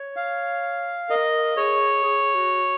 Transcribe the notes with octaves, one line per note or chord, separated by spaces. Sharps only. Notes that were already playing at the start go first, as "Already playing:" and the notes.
Already playing: C#5
F5
A#4 D#5
G#4 C#5
G#4
F#4